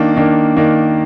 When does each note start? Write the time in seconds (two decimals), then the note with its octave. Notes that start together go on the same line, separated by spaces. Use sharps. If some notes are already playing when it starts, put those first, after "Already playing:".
Already playing: D#3 A#3 D4
0.16 D#3 A#3 D4
0.57 D#3 A#3 D4